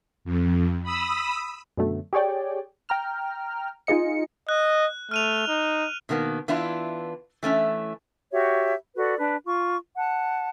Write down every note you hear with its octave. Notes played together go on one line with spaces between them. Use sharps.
F2
B5 D#6 E6
F#2 B2 D3 F#3 A3
G4 G#4 C#5 D5 G5
G5 A#5 F6
D#4 F4 G#4 D#5 C#7
D#5 F#6
A3 F6 D#7 F7
D#4
B2 D#3 A#3 B3
E3 B3 D4 E4 F4
E3 A3 C#4 E4
F#4 G4 C#5 E5
F#4 A4 B4 D5
D4 B4
F4 C#6
F#5 A5